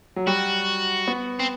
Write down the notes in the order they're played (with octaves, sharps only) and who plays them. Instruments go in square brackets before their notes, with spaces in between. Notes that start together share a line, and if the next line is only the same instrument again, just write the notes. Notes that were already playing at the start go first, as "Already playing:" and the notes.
[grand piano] F#3
[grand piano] G3 [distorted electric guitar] F#4
[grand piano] B3
[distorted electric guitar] C4